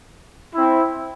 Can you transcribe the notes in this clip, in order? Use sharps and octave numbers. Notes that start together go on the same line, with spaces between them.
C4 E4